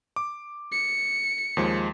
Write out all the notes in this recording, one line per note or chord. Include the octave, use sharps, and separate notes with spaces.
D6
C#7
D#2 F3 G#3